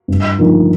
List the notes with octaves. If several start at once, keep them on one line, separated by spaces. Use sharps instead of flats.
G2
D3 F3 A#3 D#4